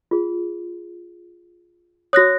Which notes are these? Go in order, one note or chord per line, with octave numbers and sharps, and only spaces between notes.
F4 G#4
F#4 C#5 D#6 F#6 A#6